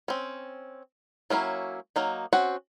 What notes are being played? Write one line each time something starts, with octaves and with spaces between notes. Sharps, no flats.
C4 C#4
F#3 A#3 C#4 E4
F#3 A#3 D#4
C4 C#4 F#4 F#5